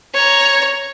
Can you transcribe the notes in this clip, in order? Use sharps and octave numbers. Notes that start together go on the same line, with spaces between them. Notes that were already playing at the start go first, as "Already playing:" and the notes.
C#5 A#5